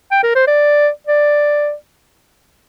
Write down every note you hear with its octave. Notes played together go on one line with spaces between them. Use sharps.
G5
A#4
C5
D5
D5